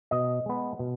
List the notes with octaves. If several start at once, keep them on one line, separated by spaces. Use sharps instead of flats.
B2 D#5
G#3 B3
B2